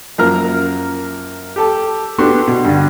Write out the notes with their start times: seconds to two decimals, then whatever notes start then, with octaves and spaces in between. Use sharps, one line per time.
0.18 F#2 F3 A#3 A#4 A#5 F6
1.56 G4 A4 A5
2.18 B3 D4 F#4 G4 A4 C6
2.47 B2
2.64 G2 D3